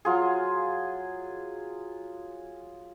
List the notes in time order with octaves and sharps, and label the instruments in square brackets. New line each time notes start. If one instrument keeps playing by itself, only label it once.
[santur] F#3 F4 G#4